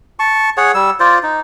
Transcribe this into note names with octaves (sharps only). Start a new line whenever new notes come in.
A5 C#6
G#4 C#5 F#5
G3 E6
F4 C5 D5
D#4